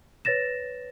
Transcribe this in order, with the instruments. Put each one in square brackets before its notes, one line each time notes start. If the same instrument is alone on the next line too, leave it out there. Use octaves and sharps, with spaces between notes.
[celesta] B4 C#5 A6 A#6 E7